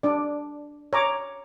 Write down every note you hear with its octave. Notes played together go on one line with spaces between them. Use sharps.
D4 D5
C#5 A#5 D6